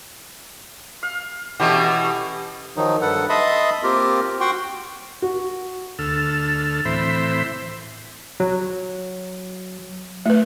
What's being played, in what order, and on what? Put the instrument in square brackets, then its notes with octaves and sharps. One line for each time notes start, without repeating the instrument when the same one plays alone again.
[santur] F5
[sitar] B2 E3 [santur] A3 C#4 G4
[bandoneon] D#3 F3 F#3 D#4
G2 A4 B4 F#5
D#5 E5 A5 B5 C6 D#6
A#3 C4 F4 G4 A#4
F#4 F#5 G5 C6 C#6
[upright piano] F#4
[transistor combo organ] D2 A4 E6 F6
A2 E3 C4 C5 E5 B5
[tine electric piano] F#3
[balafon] A3 B4